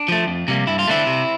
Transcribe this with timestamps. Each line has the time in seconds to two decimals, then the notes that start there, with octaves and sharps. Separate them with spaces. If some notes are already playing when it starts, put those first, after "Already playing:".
Already playing: D4
0.08 F3 A3
0.27 F2
0.48 C3 G3 A#3
0.67 G2 E4
0.79 F4
0.88 D3 A3 C4 E4
1.07 C3